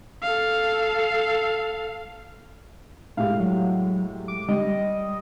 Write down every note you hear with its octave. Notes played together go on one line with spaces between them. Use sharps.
A4 F5
A2 G#3 G4 F5
F#3
D6
G3 D#5